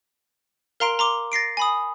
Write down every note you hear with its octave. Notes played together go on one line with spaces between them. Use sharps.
A#4 F5 A#5 C6 D7
A#5 C6 D6
A6 A#6 C7 D7
G#5 B5 D#6